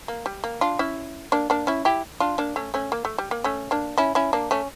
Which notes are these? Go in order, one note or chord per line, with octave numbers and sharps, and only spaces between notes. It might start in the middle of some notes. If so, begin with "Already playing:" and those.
A#3
G3
A#3
D4 F4
C#4 E4
A#3 D4
A#3 D4
C#4 E4
E4 G4
D4 F4
A#3 D4
A3 C#4
A3 C#4
A#3
A3
G3
A#3
A3 C#4
A#3 D4
C#4 E4
C#4 E4
A#3 D4
A3 C#4